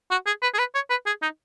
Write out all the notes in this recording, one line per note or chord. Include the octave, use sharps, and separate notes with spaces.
F#4
G#4
B4
G#4
B4
C#5
B4
G#4
D#4